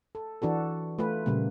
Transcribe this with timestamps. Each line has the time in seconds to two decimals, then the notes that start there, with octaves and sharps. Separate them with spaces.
0.15 A4
0.42 E3 D4 F#4 A4
0.99 A3 F4 B4
1.26 A#2 C#3 G3 A#3